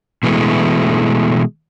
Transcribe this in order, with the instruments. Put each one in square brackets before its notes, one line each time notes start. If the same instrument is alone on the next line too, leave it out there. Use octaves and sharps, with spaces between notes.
[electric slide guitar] B2 E3 G#3 A3